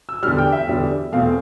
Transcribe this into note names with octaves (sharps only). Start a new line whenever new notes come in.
E6
E2 D3 G3 F6
G5
E5
E2 D3 G3
E2 B2 A3 C4 F5